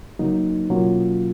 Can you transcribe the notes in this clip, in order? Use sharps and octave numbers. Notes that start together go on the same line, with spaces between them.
C#3 F#3 A#3 D#4
B2 F#3 A#3 C#4 F4